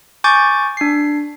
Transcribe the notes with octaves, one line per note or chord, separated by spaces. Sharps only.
G#5 C#6 D6 G6 A6
D4 C7